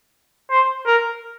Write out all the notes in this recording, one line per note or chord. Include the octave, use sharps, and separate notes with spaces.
C5
A#4